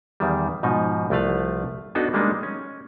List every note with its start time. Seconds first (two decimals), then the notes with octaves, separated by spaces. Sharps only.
0.20 E2 D#3 G3
0.63 G#2 B2 F3 D#4
1.10 C2 F3 A3 B4 F5
1.95 B3 D4 D#4 F#4 A4
2.13 G3 G#3 A#3 D4 D#4
2.43 C#4